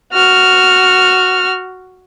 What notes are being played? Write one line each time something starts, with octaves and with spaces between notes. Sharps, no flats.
F#4 F6